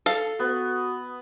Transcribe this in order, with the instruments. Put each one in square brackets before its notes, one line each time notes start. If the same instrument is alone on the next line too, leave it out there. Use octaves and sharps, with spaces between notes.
[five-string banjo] A4 F5
[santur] B3 [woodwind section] F#4